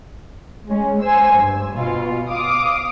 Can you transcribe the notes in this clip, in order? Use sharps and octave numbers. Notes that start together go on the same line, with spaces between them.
G#3 C#4
C5 G#5 E6
G2
B2 F4
F5 D6 D#6